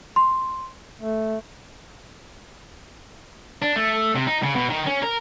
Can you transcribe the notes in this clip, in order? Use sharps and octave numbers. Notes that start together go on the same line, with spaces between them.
C6
A3
D4
A3
C3
D#4
C#3
B2
D#3
C#4
A#4